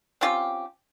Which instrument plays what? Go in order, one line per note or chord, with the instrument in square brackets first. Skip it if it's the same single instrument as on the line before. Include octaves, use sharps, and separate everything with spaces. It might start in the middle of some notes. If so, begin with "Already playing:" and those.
[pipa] C4 C#4 F4 G4